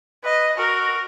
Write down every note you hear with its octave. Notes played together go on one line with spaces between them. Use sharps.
B4 D#5
F#4 A#4